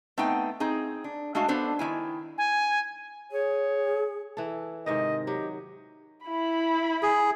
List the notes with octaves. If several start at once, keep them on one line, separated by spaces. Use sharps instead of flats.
A3 B3 C4 D#4 F#5 G5
C4 D#4 G#4
D4
G#3 A3 D4 F#4 F5
B3 D4 A4 C5
D#3 A#3 E4 G#5
G#5
G#4 C#5
E3 A4
G#2 C3 D#3 D#5
F#3 G4
E4 B5
G#4